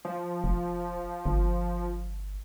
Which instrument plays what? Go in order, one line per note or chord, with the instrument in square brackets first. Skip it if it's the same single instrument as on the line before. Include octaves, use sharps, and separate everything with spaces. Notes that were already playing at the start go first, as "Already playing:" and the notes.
[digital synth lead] F3
[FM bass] F1
G1